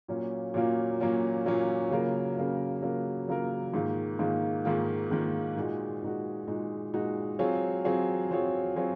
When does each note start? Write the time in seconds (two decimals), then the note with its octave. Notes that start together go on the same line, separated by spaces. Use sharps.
0.08 A#2 F#3 A#3 C#4 F4
0.54 A#2 F#3 A#3 C#4 F4
1.00 A#2 F#3 A#3 C#4 F4
1.45 A#2 F#3 A#3 C#4 F4
1.91 C#3 F#3 A#3 F4 A#4
2.37 C#3 F#3 A#3 F4 A#4
2.82 C#3 F#3 A#3 F4 A#4
3.28 C#3 F#3 A#3 F4 A#4
3.74 G#2 D#3 A#3 F4
4.19 G#2 D#3 A#3 F4
4.65 G#2 D#3 A#3 F4
5.11 G#2 D#3 A#3 F4
5.57 A#2 G#3 D#4 F#4
6.02 A#2 G#3 D#4 F#4
6.47 A#2 G#3 D#4 F#4
6.94 A#2 G#3 D#4 F#4
7.39 F#3 C4 F4 G#4 C#5
7.85 F#3 C4 F4 G#4 C#5
8.31 F#3 C4 F4 G#4 C#5
8.76 F#3 C4 F4 G#4 C#5